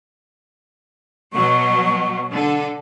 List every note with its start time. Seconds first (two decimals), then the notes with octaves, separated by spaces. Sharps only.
1.33 B2 F#3 C#6
2.32 D3 A4